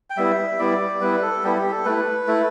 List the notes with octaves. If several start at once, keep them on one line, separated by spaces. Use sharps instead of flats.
G5
G3 B3 E4 E5
G3 B3 E4 D5
G3 B3 E4 B4
A4
G3 B3 E4 G4
G4
A4
A3 E4 B4
A3 E4